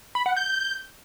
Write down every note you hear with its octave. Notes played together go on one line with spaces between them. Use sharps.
B5
F#5
G6